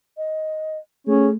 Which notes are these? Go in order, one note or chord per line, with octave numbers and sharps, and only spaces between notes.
D#5
A3 C#4 G#4